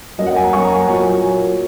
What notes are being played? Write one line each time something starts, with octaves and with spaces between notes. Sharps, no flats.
F#2 F#3 A#3 D#5
F#5
G#5
A#5
F#2 F#3 A#3 C#6
A#5
A#2 F#3 A#3 G#5
A#2 F#3 A#3